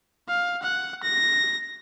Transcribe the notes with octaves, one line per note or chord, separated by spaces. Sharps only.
F5
F#5
A#6